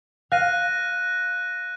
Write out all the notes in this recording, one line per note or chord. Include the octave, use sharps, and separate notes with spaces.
F5 F#6 A#6 D#7